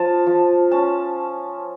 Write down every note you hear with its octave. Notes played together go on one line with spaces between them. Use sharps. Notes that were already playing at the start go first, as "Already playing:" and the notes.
Already playing: F3 A5
F3
C#4 A5